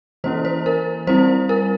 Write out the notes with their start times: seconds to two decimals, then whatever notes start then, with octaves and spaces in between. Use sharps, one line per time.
0.24 E3 A#3 C#4 E4 C5
0.45 C5
0.66 A#4
1.07 G3 C4 E4 C5
1.49 A#4